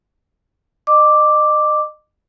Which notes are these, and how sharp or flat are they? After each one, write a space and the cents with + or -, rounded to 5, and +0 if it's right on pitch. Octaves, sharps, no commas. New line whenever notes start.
D#5 -30 D6 +0